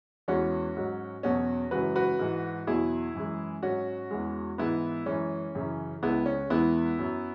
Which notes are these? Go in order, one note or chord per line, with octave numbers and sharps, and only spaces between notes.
E2 E3 G#3 C#4 F#4
G#2 F#3
E2 B2 F#3 C#4 F#4
F#2 C#3 E3 G#3 F#4 B4
F#4 B4
G#2 E3 G#3
E2 B2 F#3 E4 G#4
F#2 E3 G#3
G#2 F#3 C#4 F#4
E2 E3 G#3
G#2 E3 G#3 B3 E4
F#2 E3 G#3 C#4
F#2 C#3 E3
C#2 C#3 G#3 B3 E4
C#4
E2 E3 G#3 B3 E4
F#2 F#3